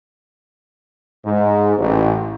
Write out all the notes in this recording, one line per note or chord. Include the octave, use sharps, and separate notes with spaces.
G#2
A1